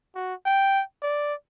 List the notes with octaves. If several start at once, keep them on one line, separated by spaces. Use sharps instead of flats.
F#4
G5
D5